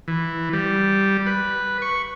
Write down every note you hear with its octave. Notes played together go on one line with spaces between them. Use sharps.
E3
G3
B4
C#6